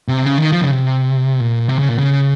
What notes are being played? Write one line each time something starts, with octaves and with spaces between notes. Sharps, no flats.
C3
C#3
D#3
F3
C#3
C3
A#2
C3
C#3
A#2
C#3